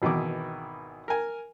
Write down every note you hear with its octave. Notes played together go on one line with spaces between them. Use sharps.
G#1 B2 D#3 E3 D6
A#4 G#5